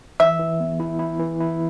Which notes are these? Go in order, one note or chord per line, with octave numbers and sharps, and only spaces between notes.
E3 E5
E3
B3
E4
E4
E3
E4